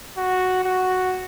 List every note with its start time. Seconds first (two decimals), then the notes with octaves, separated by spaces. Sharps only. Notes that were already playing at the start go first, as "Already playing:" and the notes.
0.18 F#4
0.64 F#4